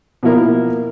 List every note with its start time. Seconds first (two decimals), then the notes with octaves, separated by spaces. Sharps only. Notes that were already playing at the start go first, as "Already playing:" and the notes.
0.23 B2 F3 A#3 E4 A#4